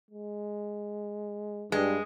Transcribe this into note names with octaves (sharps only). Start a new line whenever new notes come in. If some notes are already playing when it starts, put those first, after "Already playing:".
G#3
G2 G#3 G4